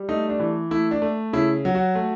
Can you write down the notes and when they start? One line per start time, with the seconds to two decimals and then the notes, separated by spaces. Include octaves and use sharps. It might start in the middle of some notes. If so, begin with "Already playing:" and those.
Already playing: G3
0.09 A3 D#4
0.29 D4
0.39 E3
0.71 A3 E4
0.91 D4
1.02 A3
1.33 C#3 E4
1.65 F#3
1.75 F#4
1.95 A3